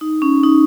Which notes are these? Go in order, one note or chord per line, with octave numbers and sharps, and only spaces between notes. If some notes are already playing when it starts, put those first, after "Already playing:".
D#4
C#4
D#4